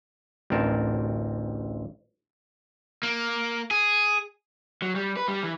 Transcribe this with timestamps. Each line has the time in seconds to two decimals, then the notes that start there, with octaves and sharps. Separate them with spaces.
0.50 A1 D2 C4 A#4 A5
3.03 A#3
3.71 G#4
4.82 F#3
4.95 G3
5.16 B4
5.28 G3
5.43 E3